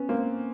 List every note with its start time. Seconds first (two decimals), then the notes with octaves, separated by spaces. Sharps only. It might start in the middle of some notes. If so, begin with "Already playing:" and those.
Already playing: B3 C#4
0.09 A#3 C4